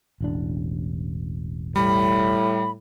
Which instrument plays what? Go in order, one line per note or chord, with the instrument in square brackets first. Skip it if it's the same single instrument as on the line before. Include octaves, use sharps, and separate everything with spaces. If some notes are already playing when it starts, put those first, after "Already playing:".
[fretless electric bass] E1 A1 D4
[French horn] A2 [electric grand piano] G3 [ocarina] B5